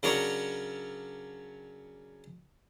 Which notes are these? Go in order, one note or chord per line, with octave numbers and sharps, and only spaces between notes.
C#3 F#3 C#4 D4 A#4 C#5